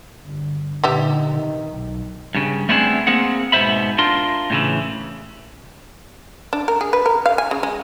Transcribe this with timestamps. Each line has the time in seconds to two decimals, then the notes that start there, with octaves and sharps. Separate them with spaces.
0.23 G1 D3
0.84 A#2 D3 B3 D#4 G4 E5
1.30 C3 D#3
1.70 B1
2.35 G2 C#3
2.69 A3 B3 C4 D4 E4 G#4
3.07 A#3 C4 G#4 F#5
3.52 G#2 B2 B3 C5 E5 B5
3.98 D4 F4 A#4 C6
4.50 A2 C#3 E3
6.53 D4
6.68 A#4
6.81 G#4
6.93 B4
7.06 A#4
7.26 F5
7.38 G#5
7.51 C#3
7.63 G#3